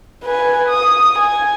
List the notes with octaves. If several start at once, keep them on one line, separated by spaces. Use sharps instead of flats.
B4 G#5
D#6
G#5